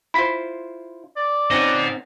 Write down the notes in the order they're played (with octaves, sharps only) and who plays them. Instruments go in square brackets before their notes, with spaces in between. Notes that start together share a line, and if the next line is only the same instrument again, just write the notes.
[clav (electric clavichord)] E4 F4 C5 [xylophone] B5 B6
[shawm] D5
[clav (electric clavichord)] C4 C#4 D#4 [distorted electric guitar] D#5 F#5